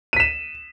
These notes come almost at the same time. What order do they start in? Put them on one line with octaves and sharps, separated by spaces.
D#7 B6 E7